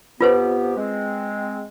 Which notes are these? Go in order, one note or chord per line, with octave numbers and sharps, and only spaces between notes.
F2 B3 F4 G4 B4 C5
G#3 C4